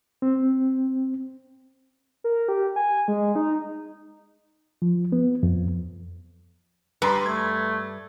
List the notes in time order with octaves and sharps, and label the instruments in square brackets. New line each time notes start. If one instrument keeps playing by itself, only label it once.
[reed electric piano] C4
[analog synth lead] A#4
G4
G#5
G#3
D#4
[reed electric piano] F3
B3
F2
[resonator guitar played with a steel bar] G2 G3 [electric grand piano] B4 A#5 C6
[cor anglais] A3 [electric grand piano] G#6